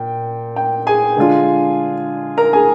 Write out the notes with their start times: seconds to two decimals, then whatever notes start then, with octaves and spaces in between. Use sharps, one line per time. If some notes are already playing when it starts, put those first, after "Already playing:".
Already playing: A#2 G5
0.56 G5
0.87 G#4 G#5
1.17 D3 G#3 D4 F4
2.38 A#4 A#5
2.53 G#4 G#5